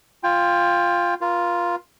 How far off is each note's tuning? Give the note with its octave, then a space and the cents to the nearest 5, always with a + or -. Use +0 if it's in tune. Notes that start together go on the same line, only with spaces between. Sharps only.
F4 +0 G5 +20
F4 +0 A#4 +40